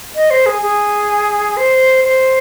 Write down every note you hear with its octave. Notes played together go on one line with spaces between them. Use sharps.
D#5
C5
G#4
G#4
C5
C5